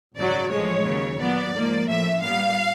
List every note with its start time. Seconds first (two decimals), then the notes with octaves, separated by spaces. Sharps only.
0.17 G#1 F#2 C#3 F#3 D5
0.50 A1 A2 F3 G#3 C#5
0.85 D#2 C#3 F#3
1.19 A#2 F#3 B3 D5
1.53 G#2 F3 A#3
1.88 A1 A2 F3 E5
2.21 A#2 G3 B3 F5